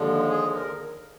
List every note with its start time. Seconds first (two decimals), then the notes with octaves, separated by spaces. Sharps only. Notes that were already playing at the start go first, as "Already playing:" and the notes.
Already playing: D#2 D3 F3 G#3
0.30 G#4
0.54 A#4